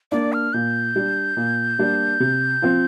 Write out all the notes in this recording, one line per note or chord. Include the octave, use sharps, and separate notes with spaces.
A#3 D4 D5
F6
A#2 G6
G3 D4
A#2
G3 A#3 D4
C3
F3 C4